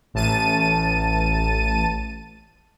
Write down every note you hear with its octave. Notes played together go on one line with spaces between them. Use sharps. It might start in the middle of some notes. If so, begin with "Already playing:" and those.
A1 A5 D#7